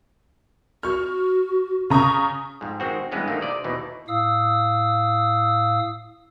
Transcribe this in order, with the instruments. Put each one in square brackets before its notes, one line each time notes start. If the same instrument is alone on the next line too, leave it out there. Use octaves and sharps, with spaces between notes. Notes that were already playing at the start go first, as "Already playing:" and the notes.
[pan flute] F#4 [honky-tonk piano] C#6 F6
[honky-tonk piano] C#3 A#5 D#6 [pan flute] C#6
[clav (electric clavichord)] F2 G#2
D#3 G#3 C4 F#4
G2 E3 G#3 B3 C#4
D#3 F3 A3 A#3
C3 D5 D#5
D#2 B2 E3 D#4
[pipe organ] A2 F5 D#6 E6